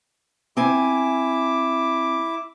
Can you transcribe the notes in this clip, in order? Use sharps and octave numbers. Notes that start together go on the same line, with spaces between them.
C4 E4 G#5 D6